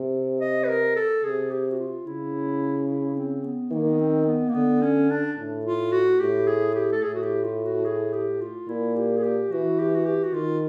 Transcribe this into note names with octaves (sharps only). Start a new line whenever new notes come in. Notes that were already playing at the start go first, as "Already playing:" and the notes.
Already playing: C3
D#5
B4
A#4
A4
C3 G#4
G4
F#4
F4
C#3 E4
E4
C4
B3
D#3 A#3
B3
C4
B3
A#3
D3 B3
C#4
D4
A2
F4
F#4
A2 G4
G#4
G4
A4
A2 G#4
F#4
G4
F4
F#4
G#4
G4
F4
A#2 E4
G4
G#4
G4
E3 F#4
G4
F#4
G4
F#4
D#3 F4